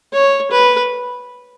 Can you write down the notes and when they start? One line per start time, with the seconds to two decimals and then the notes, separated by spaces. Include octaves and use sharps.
0.13 C#5
0.51 B4